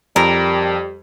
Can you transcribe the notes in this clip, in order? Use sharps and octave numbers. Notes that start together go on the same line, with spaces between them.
F2 G3 A#4